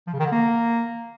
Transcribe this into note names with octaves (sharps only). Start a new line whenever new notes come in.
F3
C#3
D#3
D3
A#3